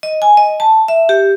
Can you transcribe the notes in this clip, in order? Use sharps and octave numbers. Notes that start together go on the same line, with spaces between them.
D#5
G#5
D#5
A5
E5
G4